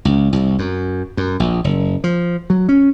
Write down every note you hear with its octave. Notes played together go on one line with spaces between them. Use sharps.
C#2
C2
F#2
F#2
A#1
F#1
F3
F#3
C#4